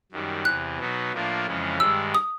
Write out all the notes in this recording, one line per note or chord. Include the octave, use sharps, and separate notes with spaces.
F#2 D#3 G3
E2 C3 E3 F#6
B2 F#3 B3 D#4
A2 F3 A#3 D4 F4
F2 C#3 E3 G#3 C#4
G2 D#3 G#3 E6
D#6